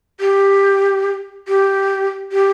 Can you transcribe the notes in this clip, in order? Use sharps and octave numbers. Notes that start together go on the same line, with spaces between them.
G4
G4
G4